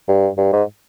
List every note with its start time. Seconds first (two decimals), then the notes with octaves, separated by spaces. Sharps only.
0.08 G2
0.37 G2
0.53 G#2